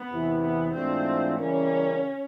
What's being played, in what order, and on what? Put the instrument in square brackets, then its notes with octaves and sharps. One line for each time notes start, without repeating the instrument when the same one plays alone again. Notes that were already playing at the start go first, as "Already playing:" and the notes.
Already playing: [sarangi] B3
[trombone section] E2 C3 E3
[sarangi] B3
[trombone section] G#2 E3 A3 D4 F4 [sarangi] C4
[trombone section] C#3 E3 G3 A#3 [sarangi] C#4